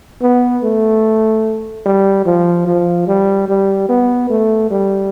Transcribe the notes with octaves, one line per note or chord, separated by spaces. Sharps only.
B3
A3
G3
F3
F3
G3
G3
B3
A3
G3